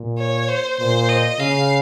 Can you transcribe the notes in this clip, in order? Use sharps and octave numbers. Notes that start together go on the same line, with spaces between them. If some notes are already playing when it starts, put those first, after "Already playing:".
Already playing: A#2
C#5
C5
A#2 C5
D#5
C#3 F5